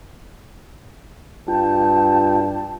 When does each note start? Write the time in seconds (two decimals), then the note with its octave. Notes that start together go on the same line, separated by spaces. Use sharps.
1.48 G2 F4 G5 A5